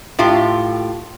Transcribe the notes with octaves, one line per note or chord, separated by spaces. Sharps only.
A2 F4 G4